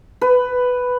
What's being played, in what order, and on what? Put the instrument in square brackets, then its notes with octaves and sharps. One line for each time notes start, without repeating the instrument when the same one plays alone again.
[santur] B4